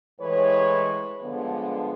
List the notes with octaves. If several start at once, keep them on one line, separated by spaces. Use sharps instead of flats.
A2 E3 G#3 B4 C#5
G2 D3 F3 G#3 B3